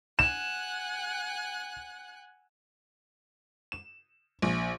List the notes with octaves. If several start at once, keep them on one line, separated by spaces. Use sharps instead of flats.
F#5 G#5 F#6 E7
E7
A#1